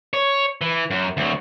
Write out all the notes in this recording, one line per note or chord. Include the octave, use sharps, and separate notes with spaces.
C#5
E3
F#2
D2 F#3